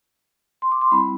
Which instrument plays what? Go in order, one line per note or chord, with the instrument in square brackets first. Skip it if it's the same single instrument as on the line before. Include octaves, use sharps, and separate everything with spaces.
[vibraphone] C6
D6
C6
G3 C4 E4 B5